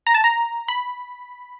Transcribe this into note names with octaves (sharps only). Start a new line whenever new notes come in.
A#5
A5
A#5
B5